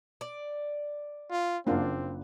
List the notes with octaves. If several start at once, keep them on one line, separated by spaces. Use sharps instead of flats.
D5
F4
F#1 A#3 C4 D4 F4 F#5